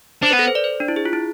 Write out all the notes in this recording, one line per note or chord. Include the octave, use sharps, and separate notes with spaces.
D4 C5
B4
B3
A4
C5
D5
C5
D4
E4
G#4
F4
E4